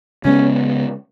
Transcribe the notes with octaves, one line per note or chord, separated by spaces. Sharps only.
C#3 G#3 B3 C#4